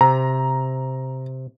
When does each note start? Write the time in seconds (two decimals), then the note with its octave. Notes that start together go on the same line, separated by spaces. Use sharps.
0.01 C3 A#5